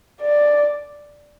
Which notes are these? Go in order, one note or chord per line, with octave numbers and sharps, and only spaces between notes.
D5